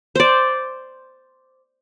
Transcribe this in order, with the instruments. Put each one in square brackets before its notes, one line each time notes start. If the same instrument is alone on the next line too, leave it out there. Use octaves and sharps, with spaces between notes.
[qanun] C5 D5